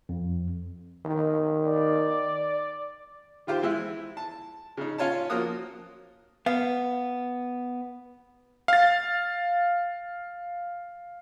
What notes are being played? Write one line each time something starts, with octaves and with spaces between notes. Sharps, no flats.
F2
D#3
D5
D#3 F4 G4 C5
E3 G#3 E4
A5
C#3 D#4
C#4 F4 C#5 A5
F3 A#3 F#4 D#6
B3 F5
F5 A6